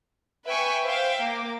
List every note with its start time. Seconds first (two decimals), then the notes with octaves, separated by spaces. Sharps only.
0.45 B4 E5 G5 G#5 C#6
0.83 C5 E5 F5 G5
1.22 A#3 D6